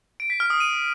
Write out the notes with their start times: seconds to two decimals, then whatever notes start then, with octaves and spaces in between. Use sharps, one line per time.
0.20 D7
0.30 B6
0.40 F6
0.50 D#6
0.60 D#7